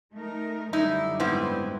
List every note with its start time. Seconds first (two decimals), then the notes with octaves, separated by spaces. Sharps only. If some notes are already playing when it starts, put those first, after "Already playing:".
0.13 A3 D#4 A#4
0.73 F#2 D3 G3 D#4 E4
1.20 G#2 B3 C4 E4